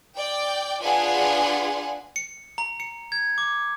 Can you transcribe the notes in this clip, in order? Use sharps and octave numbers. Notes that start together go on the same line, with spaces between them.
D5 G5
D4 F4 G#4 B4 F#5 G#5
C#7
A#5
C#7
G#6
D6